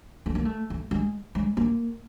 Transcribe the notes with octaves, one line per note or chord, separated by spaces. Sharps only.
A3
A#3
A3
A3
G#3
G#3
A#3